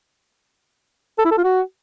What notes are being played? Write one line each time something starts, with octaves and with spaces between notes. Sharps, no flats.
A4
E4
A4
F4
F#4